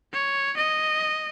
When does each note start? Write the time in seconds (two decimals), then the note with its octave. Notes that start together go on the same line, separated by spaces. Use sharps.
0.13 C#5
0.57 D#5